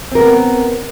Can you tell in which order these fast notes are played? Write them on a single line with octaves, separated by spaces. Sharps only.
C4 A#4 B3